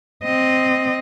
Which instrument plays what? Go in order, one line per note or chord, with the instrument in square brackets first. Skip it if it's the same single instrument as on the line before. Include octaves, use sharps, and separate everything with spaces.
[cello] C4 D#5